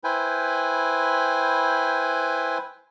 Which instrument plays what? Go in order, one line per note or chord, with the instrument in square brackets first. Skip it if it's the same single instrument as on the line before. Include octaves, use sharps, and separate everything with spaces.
[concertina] E4 B4 C5 G5 G#5